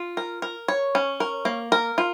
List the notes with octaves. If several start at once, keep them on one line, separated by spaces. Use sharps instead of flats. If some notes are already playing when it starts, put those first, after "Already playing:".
Already playing: F4
A#4
A#4
C#5
C#4
A#4
A#3
A#4
F4